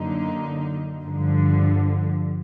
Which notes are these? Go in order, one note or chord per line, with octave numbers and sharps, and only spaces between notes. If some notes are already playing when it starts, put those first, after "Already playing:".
Already playing: F#2 D3 F#3 A#3 D#4
G2 D3 F3